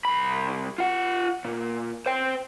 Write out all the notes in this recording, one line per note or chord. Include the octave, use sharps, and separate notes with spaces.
C2 B5
F4 F#5
A#2
C5 G5